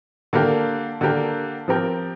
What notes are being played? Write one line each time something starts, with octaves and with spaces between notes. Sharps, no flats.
D3 A#3 G4 A#4
D3 A#3 G4 A#4
F3 C4 G4 A#4